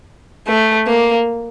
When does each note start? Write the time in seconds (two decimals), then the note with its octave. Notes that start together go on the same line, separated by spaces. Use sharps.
0.47 A3
0.87 A#3